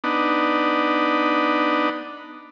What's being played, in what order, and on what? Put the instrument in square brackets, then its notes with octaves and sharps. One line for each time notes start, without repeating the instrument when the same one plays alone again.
[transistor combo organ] B3 D4 D#4